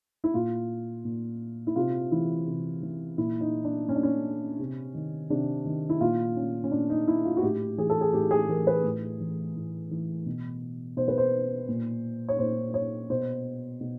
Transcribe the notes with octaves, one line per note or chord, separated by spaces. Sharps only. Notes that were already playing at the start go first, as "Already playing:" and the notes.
E4
A#2 F4
A#2
E4
C3 F4
E3 E4
C3
E3
A#2 E4
D#4
D4
A#2 C#4
D4
C#4
C3
D#3
C3 D4
D#3
E4
A#2 F4
C#4
C#4
A#2 D4
D#4
E4
F4
F#4
A2 G4
E3 G#4
A4
G#4
A2 G4
G#4
E3 A#4
B4
A2
E3
A2
E3
B2
B2 C5
B4
C5
A#2
C#5
A#2 C5
C#5
B2 C5
B2